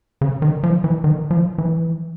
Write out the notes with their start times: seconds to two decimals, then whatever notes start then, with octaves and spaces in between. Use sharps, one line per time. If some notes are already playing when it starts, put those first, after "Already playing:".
0.21 C#3
0.42 D#3
0.63 F3
0.84 E3
1.04 D#3
1.31 F3
1.58 E3